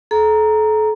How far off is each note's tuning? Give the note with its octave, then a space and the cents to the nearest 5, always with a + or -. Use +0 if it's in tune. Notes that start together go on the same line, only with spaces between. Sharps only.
A4 -40 A#5 +0